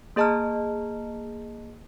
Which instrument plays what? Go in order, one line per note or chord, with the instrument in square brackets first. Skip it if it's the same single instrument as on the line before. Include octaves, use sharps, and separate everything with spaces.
[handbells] A#3 G#4 D#5 A5 A#5 F6